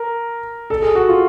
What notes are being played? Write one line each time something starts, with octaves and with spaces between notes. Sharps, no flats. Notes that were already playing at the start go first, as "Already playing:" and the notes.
Already playing: A#4
A4
G#4
F#4
F4